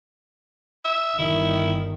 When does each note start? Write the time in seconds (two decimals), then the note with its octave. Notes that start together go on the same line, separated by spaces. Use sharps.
0.85 E5
1.19 G1 D#3 E4